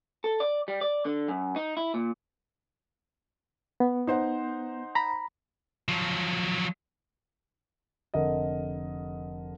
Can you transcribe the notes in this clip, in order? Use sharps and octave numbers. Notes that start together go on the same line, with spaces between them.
A4
D5
G3
D5
D3
F#2
D#4
E4
A#2
B3
D#4 C5 F#5
A#5 B5
F3 F#3
F1 D3 A#4 D#5